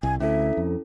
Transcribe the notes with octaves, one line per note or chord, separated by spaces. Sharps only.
C2 G#5
D2 C#4 E4 A4 E5
F2